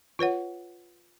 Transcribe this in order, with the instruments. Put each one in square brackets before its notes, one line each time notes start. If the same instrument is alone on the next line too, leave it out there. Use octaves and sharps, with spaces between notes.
[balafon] F4 B4 C#5 F#5